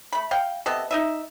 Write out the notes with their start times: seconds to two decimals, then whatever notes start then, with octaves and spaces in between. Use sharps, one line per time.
0.13 A3 B5
0.31 F5 G5
0.66 C3 B3 A4 D#5
0.91 D#4 D#5 E5